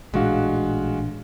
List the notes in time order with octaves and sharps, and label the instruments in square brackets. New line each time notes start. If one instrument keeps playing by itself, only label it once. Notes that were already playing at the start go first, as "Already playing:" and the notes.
[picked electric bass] A1 A#2 D4 [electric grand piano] G#3 F#4 F5